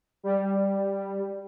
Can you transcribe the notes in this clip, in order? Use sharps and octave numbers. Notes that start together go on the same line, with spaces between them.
G3